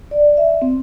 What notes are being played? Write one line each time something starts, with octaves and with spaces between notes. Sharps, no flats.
D5
E5
C4